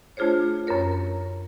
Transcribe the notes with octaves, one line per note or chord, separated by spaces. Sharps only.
A3 D4 F4 G#4 C5 C#5
F#2 C#4 G4 A#4 C#5